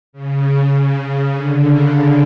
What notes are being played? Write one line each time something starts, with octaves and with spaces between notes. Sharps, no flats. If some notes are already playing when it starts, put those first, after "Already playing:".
C#3
D3
C#3
C#3